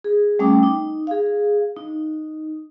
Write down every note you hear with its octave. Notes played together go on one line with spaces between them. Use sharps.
G#4
G3 A3 C#4 G5 D6 D#6
D#4
G#4 F5
D#4